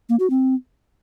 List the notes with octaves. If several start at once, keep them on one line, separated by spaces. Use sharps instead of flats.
A#3
F#4
C4